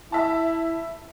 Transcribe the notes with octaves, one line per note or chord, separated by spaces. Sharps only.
E4 E5 A5